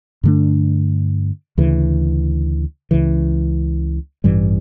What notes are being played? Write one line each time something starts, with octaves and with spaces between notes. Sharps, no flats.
G2 D3 A3 D4
D2 C#3 E3
C#2 C#3 E3
A1 G2 E3 G3